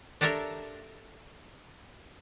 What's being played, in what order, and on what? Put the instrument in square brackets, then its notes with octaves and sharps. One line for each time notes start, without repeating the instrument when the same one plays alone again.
[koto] D4 G4 A4 A#4 C#5 E5